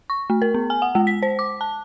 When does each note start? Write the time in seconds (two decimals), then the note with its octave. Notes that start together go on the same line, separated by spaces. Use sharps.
0.10 C#6
0.30 A3
0.42 A#4
0.54 B3
0.70 G#5
0.82 F#5
0.95 G#3
1.07 B6
1.23 C5
1.39 D6
1.61 A5